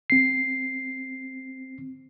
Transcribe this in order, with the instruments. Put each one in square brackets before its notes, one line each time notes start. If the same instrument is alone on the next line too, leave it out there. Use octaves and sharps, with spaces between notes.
[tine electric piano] C4 C7